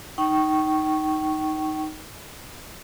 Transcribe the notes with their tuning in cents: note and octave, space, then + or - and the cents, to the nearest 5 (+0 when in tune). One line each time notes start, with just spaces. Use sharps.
D#4 +0 G5 -30 C#6 -10